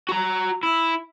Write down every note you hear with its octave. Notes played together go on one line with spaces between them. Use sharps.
F#4 A#5
E4